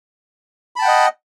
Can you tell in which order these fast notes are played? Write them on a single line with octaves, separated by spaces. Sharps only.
B5 A5 G5 F#5 D#5